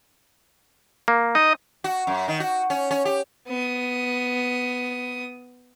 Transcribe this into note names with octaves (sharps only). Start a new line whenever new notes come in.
A#3
D#4 D#5
F#4
F#2
D#3
F#4
C#4
C#4
G4
B3 D#6